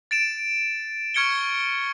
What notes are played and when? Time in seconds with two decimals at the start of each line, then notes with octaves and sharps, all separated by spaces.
0.11 A6 D7 E7
1.14 C#6 F6 G#6 C#7 D7 G7